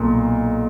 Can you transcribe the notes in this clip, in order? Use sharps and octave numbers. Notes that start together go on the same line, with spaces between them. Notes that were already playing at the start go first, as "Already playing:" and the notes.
Already playing: B1 A#2